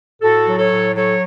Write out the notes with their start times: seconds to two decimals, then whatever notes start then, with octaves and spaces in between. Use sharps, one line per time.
0.22 A2 F#4 A4
0.47 F#3
0.58 A4 C#5
0.72 A2
0.95 F#3 A4 C#5